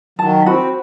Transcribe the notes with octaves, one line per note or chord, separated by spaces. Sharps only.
D#3 F#3 A5
C4 F#4 B5